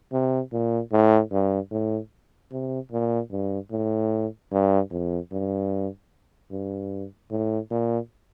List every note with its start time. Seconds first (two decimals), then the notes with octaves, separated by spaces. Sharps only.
0.13 C3
0.53 A#2
0.92 A2
1.32 G2
1.71 A2
2.52 C3
2.92 A#2
3.31 G2
3.71 A2
4.52 G2
4.91 F2
5.32 G2
6.51 G2
7.31 A2
7.71 A#2